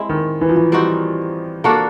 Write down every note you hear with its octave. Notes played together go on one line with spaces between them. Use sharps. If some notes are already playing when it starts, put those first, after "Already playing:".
Already playing: G#3 C4 E4
D#3
E3
F3
E3
G3 C4 D#4 F#4
A#3 D4 F#4 A4